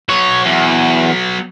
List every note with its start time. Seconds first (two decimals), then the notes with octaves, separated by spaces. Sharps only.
0.09 F#3 B3 C#5
0.46 E2